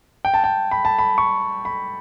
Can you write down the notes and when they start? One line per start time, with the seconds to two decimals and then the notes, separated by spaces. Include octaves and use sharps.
0.25 G5
0.34 A5
0.44 G5
0.71 B5
0.85 A5
0.99 B5
1.18 C#6
1.65 B5